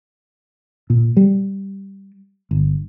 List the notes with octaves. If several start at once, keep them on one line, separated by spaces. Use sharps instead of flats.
A#2
G3
G1